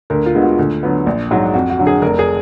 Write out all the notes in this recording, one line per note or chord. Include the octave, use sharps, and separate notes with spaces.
D2 A#4
F4
D3 G#3 B3
F#4
D2
D3 F#3 B3
A#1
G#2 F#3
F2 F#4
F#4
D3 F#3
G#4
F1 A#4
G#4